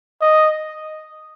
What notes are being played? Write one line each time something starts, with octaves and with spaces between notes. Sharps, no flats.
D#5